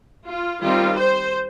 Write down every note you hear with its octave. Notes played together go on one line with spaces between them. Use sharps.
F4
D#3 G3 C4 F4
C5